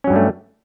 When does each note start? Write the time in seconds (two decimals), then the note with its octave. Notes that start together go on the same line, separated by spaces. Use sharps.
0.04 C#4
0.07 F#3
0.10 G2
0.13 G3
0.16 A3